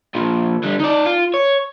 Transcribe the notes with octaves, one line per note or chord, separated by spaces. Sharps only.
A#2 F3
D3 G3
D#4 D5
F4
C#5